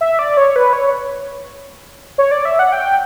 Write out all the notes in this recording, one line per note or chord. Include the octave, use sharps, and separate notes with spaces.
E5
D5
C#5
B4
C#5
C#5
D5
E5
F#5
G5